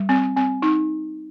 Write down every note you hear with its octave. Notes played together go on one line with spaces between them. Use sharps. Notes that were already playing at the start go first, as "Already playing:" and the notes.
Already playing: G3
C4
C4
D#4